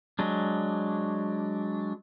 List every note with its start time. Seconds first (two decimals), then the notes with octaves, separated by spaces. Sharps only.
0.19 F#3 G#3 D4